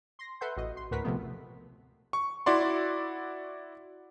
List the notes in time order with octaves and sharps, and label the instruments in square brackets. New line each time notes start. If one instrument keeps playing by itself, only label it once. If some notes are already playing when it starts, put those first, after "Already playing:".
[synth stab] C6 A#6
A4 B4 E5 F#5 C6 G6
A1 F#4 D#5
C6
D2 A2 F#4 A#4 B4 B6
C3 F3 A3 B3
[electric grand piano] C#6
E4 F#4 D5 C6